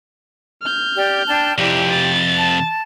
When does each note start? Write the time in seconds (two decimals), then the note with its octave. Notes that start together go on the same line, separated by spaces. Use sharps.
0.62 F6 G6
0.96 G4 D5
1.27 D4 G5 A5
1.58 F2 C3 E4 G4 D5
1.90 A6
2.38 A5